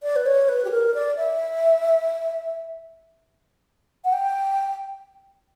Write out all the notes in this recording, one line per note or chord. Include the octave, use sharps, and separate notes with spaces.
D5
B4
C#5
B4
G4
A#4
D5
E5
F#5
G5